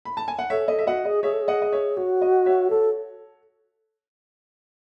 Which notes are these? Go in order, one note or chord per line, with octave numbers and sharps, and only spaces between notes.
B5
A5
G#5
F#5
A4 C#5 E5
A4 D#5
E5
F#4 D#5 F#5
G#4 D#5
G#4 C#5 E5
A4
G#4
D#5 F#5
D#5
C#5 E5
F#4 C#5
D#5
C#5 E5
A4 C#5